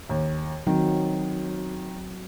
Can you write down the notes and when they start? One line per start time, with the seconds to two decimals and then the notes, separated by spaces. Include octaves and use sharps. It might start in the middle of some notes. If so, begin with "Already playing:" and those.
0.09 D#2
0.67 D#3 F#3 C4